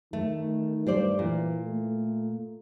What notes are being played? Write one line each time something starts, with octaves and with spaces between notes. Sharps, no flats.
D#3 A3
G2 G3 C5 D5
A#2 E3
A3